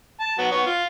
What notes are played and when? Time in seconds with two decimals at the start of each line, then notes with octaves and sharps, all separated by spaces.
0.20 A5
0.38 F#3 B3
0.51 B3 C#5
0.66 F4